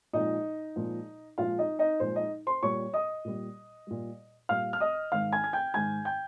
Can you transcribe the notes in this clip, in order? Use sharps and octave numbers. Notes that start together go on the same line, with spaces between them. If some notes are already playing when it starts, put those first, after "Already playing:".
A#2 F3 G#3 D#4 D#5
A#2 F3 G#3
A#2 F3 G#3 F4 F5
D#4 D#5
D#4 D#5
A#2 F3 G#3 C5
D#4 D#5
C5 C6
A#2 G3 C#5 C#6
D#5 D#6
A#2 G3
A#2 G3
A#2 G3 F5 F6
F6
D#5 D#6
G#2 D#3 G#3 F5 F6
G#5 G#6
G#6
G5 G6
G#2 D#3 G#3 G#5 G#6
G5 G6